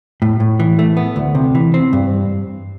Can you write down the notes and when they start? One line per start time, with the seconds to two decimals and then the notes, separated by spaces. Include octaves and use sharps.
0.22 A2
0.40 A2
0.60 E3
0.79 A3
0.97 B3
1.16 D2
1.35 C3
1.55 E3
1.74 C4
1.93 G2